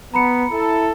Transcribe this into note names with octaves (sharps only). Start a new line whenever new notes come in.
B3 A#5 B5 C#7
E4 A4